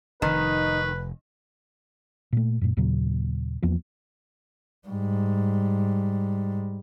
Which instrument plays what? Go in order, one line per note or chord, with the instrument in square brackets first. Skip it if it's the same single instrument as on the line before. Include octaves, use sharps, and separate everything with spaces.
[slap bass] F1 [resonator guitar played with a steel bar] D#3 [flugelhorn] D#4 [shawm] B4
[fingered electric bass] A#2 A3
F#2 A#2
D#2 A#2 C#3 F#3
E2 F3 A#3 B3
[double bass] G#2 G3